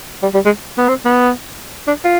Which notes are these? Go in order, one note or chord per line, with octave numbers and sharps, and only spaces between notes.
G3
G3
G#3
B3
C4
B3
D4
F4